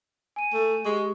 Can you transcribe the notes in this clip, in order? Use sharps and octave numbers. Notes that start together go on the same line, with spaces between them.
G#5 D#7
A3
G#3 G4 C#6